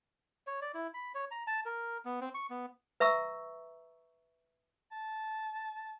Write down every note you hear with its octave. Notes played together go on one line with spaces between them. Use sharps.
C#5
D5
E4
B5
C#5
A#5
A5
A#4
B3
C4
C#6
B3
B4 E5 A#5 C#6 E6
A5